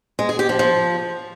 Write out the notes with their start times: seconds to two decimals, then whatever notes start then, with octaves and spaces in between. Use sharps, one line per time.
0.19 G#3
0.29 G#4
0.39 G4
0.49 F3
0.59 F3